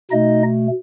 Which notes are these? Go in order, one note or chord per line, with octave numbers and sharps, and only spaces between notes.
B2 A3 D#4 D#5